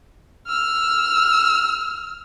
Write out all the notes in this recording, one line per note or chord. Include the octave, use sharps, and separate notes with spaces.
E6 F6